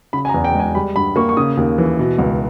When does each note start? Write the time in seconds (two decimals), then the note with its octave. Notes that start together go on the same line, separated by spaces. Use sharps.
0.13 C#3 B5
0.25 G#5
0.29 A#5
0.34 E2
0.44 G5
0.54 G#3
0.60 G#5
0.75 G3 B5
0.96 G2 B5
1.16 A#3 C#6
1.29 C#6
1.37 C#3 D#6
1.57 D#2
1.78 E3
1.99 B2
2.18 C#2